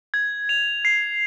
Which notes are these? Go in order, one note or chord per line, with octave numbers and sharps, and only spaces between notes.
G#6
F7
C7